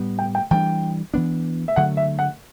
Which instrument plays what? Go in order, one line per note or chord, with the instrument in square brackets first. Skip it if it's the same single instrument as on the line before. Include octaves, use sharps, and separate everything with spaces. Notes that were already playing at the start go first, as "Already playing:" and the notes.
Already playing: [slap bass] A2 G3 B3
[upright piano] G5
G5
[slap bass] E3 G3 D4 [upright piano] G5
[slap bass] E3 B3 D4
[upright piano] E5
[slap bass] D3 F#3 A3 [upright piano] F#5
[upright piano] E5
F#5